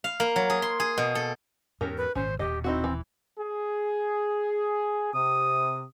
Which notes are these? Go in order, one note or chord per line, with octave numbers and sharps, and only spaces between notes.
F5
A#3
F#3
G#4
C6
G#4
B2
A4
E2 G#2 C#4 G4 A#4
B4
G#1 A#2 C#4 C5
D#1 B2 G4 D#5
C4 D#4 E4 F#4
E3
G#4
C3 D#6